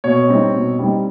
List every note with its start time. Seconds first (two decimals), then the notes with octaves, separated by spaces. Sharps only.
0.04 B2 C#5
0.28 G3 C4 D#4
0.54 B2
0.79 G3 C4 D#4